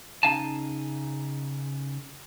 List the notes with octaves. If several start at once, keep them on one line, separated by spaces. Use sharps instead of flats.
C#3 A#3 D#4 F5 G#5 A5